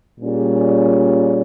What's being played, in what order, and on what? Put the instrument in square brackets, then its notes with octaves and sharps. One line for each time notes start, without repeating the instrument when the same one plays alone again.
[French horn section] A#2 G3 C#4 G#4